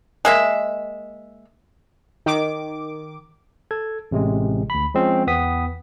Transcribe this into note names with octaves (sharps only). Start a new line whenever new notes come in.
G#3 A#3 E5
D#3 D6
A4 G#6
A1 C3 G#3
D2 B5
F3 G#3 C4 C#4 F4
E2 B3 G5 D#6 B6